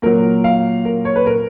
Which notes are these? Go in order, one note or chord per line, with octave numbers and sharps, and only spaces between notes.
A#2 F#3 A#4
F5
A#4
C#5
B4
A#4